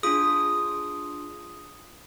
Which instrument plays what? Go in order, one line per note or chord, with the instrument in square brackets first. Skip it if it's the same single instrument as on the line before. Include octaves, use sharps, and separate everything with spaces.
[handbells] D4 F4 G#4 D#6